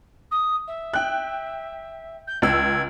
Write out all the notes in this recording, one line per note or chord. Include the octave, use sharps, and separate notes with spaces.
D#6
E5
G5 F#6
G6
C#2 E6 G#6